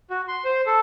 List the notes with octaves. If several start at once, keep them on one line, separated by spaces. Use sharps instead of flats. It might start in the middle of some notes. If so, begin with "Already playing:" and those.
F#4
C6
C5
A4